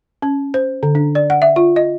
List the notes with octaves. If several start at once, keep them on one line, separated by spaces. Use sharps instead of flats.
C#4
C5
D3
D4
D5
F#5
E5
F4
D#5